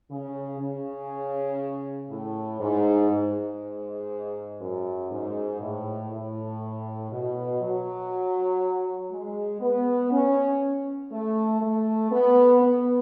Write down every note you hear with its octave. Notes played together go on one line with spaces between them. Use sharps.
C#3
C#3
A2
G#2
G#2
F#2
G#2
A2
A2
B2
F#3
G#3
B3
C#4
A3
A3
B3
B3